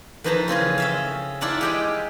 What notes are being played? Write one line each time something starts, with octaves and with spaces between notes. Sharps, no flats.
F2 E3 B4 C5 A5 A#5
C#3 C4 F4 G#4
C#4 E5 F5
E4 F4 D5 F#5 A5 A#5
G#3 G4 D#5